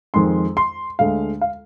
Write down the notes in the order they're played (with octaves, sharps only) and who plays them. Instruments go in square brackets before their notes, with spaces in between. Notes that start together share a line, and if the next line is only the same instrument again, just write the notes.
[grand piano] F2 D#3 G#3 C6
C6
D2 D3 G#3 F5
F5